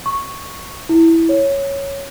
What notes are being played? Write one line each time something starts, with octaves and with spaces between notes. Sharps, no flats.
C#6
E4
C#5